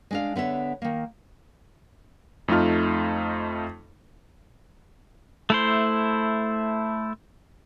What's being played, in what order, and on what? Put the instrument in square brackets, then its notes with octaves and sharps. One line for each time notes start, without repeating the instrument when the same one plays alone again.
[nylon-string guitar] G#3 D4 F5
D3 B3 C#5 E5
D#3 A#3
[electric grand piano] F2 A3 D#4 F4 F6
[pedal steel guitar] A3 E4 C5